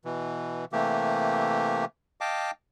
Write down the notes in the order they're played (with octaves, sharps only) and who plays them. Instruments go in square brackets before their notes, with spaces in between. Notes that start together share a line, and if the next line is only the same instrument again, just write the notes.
[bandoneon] B2 E3
C3 E3 A3 A#3 G4
D#5 F5 G5 A5 D6